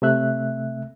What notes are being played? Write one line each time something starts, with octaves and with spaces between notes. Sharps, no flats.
C3 A3 E5 F#6